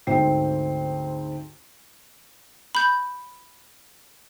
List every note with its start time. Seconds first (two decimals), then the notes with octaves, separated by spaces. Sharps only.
0.07 D2 G#2 C4 G5 C7
2.75 B5 G6